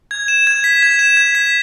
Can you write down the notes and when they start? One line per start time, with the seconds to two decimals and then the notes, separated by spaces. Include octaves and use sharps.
0.11 G#6
0.28 E7
0.47 G#6
0.64 B6
0.83 G#6
0.99 E7
1.17 G#6
1.35 B6